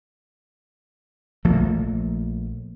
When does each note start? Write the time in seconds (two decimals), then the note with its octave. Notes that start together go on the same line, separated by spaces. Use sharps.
1.45 A#1 F3 A3 A#3